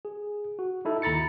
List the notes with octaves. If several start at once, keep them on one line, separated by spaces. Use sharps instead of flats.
G#4
F#4
D#4 E4 A4
D#2 A#5 B5 A6 C#7